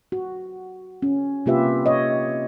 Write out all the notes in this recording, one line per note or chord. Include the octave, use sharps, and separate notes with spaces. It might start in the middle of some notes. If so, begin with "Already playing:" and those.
F#4
C#4
C3 A#3 F4 G4 B4 E5
C#5 D#5